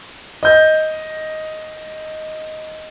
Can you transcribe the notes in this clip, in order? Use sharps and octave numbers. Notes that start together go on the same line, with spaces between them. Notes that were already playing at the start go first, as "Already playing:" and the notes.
D#5 G6